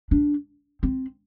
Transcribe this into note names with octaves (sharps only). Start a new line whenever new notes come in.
D4
C4